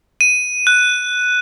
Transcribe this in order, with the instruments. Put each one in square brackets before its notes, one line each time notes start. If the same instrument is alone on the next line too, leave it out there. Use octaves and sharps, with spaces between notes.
[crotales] D#7
F#6